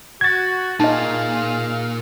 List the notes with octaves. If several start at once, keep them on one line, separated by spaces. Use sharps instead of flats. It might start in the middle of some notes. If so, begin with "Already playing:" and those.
F#4 G#6 A6
A#2 D#4 G#4 D#5 F5